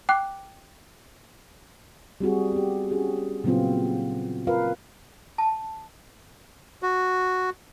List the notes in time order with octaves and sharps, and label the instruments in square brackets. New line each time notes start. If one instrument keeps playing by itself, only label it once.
[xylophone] G5 D6 F#6
[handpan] G3 C4 F#4 G#4
B3 G4
C#4 F#4 G#4
A#2 C#3 F#3 B3 C4 F4
F4 A#4 B4 F5
[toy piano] A5
[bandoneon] F#4